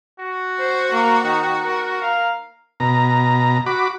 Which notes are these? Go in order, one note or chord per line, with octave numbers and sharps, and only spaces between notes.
F#4
C5
A#3
D#3
A#4
F5
B2 A#5
F#4 B5 D6